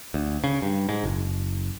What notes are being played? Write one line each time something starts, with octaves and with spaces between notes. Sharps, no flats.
D2
C#3
G2
G#2
F#1